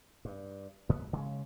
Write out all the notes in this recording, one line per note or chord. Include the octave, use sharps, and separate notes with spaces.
G2
G#2 B3
C#3 G#3 C#4